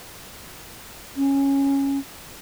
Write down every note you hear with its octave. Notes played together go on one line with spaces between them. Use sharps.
C#4